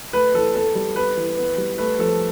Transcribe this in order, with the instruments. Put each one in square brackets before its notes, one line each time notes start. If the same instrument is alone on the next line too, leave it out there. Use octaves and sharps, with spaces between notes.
[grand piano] A3 B4
E3 A4
B3 A4
G3
B3 B4
E3
B3
G3
A3 B4
F3 A4